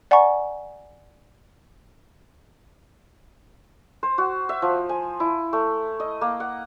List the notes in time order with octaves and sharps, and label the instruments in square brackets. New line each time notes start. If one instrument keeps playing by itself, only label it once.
[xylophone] D5 F#5 G#5 A#5 C#6
[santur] C5
F#4
E5
F3
G#5
E4
A3
D#5
A#3
F#5